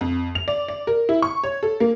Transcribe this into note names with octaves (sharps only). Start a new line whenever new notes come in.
F2
F7
D5
D5
A#4
E4
C#6
C#5
A4
A#3